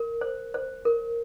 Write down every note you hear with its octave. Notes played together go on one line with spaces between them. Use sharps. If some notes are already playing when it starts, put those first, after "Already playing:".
Already playing: A#4
C5
C5
A#4